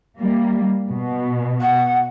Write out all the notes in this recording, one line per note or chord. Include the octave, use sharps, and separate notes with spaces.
G3 A#3
B2
F#5